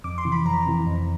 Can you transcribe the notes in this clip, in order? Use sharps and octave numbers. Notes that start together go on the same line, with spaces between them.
F2 D6
C6
C3 E3
B5
F2 A#5
C3 E3
F2